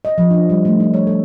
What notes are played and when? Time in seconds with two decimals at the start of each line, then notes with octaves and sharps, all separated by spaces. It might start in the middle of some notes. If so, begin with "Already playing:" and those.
0.05 D#5
0.18 F3
0.30 D4
0.50 G3
0.65 A3
0.80 D#4
0.94 C#5
1.07 A4